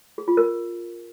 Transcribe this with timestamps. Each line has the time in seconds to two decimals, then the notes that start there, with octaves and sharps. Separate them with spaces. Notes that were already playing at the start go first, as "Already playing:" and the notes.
0.18 G#4
0.28 F4
0.37 A#4